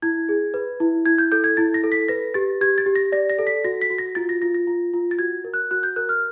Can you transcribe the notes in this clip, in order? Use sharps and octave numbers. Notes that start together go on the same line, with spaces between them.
E4 G#6
G#4
B4
E4
E4 G#6
G6
A4 G6
G#6
E4 A6
A#6
A4
B6
B4 A#6
G4 A6
G4 G#6
A6
G4
A#6
D5 A#6
A#6
A4
B6
F#4 A#6
B6
F#4
A#6
F4 A6
A#6
F4 A#6
A#6
F4
F4
A6
F#4 G#6
A#4
F#6
F#4 F#6
G6
A#4 F#6
F6